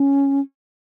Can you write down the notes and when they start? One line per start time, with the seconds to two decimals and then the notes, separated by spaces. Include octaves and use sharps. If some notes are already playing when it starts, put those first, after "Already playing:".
Already playing: C#4